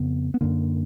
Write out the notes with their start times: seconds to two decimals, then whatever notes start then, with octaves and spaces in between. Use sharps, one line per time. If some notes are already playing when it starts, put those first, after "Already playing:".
Already playing: F2 C#3 B3
0.34 B3
0.41 F#2 D3 A#3